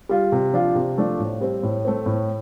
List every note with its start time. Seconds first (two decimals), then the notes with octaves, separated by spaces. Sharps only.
0.09 G3 F4
0.32 C3
0.53 F3 D4 F4
0.75 C3
0.97 F3 A3 D4 F4
1.19 A2
1.41 G3 C4
1.63 A2
1.85 A3 C4
2.06 A2